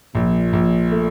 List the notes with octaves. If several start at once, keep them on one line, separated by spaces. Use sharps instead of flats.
A#1 A#2
A#1
A3